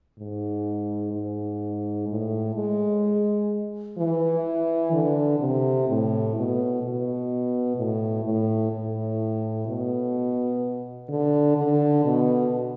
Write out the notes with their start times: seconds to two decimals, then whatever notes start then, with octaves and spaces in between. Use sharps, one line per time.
0.19 G#2
1.13 G#2
2.09 A2
2.55 G#3
3.98 E3
4.92 D3
5.40 C3
5.88 A2
6.35 B2
6.82 B2
7.77 A2
8.24 A2
8.72 A2
9.67 B2
11.09 D3
11.57 D3
12.04 B2